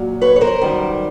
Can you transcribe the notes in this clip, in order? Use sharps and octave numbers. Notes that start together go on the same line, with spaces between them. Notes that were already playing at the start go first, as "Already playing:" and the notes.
Already playing: A#2 F#3
B4 C#5
C#5
A#4 C5
F#2 D#3 G3